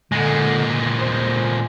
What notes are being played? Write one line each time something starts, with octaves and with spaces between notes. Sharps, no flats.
A#2 D3 G#3
C5